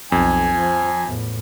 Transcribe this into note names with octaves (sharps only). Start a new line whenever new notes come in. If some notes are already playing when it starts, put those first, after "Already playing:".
B1 F2 G#5
F3
E2 A2